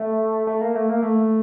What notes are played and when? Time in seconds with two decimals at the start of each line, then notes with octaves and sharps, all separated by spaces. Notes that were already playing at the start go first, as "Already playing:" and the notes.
Already playing: A3
0.47 A3
0.61 A#3
0.76 A3
0.90 A#3
1.02 A3